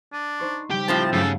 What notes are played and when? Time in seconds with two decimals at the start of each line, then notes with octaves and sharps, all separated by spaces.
0.13 D4 D#7
0.39 D#4 C5 C#6
0.70 C#3 G3 G4 G5
0.88 A2 F3 C4 A5
1.13 G2 C#3 F#3 A3 A4